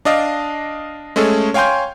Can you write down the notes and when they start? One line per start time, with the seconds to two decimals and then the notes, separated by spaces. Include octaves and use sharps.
0.05 D4 D5 D#5 F5
1.16 G#3 A3 C#4 G#4 A4
1.54 C#5 F5 G5 G#5 C6 G6